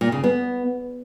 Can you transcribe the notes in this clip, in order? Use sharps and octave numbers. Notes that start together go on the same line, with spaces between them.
A#2
C#3
B3